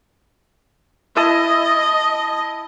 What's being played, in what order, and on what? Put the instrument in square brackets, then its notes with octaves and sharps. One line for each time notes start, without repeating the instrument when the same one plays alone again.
[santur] E4 A5 D#6 [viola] D#5